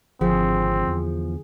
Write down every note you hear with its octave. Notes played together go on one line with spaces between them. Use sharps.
G#1 D3 F3 C4 G#4
E2